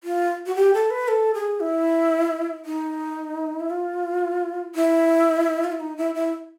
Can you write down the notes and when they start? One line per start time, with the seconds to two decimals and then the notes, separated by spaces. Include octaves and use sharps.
0.04 F4
0.46 F#4
0.56 G4
0.74 A4
0.91 B4
1.08 A4
1.34 G#4
1.60 E4
2.66 D#4
3.60 E4
3.70 F4
4.75 E4
5.64 F4
5.72 E4
5.80 D#4
5.97 E4
6.15 E4